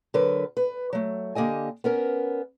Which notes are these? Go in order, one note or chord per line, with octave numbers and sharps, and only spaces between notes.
D3 F#3 A#4 B4
B4
F#3 A3
D3 A#3 G4 D#5 G#5
B3 C#4 A#4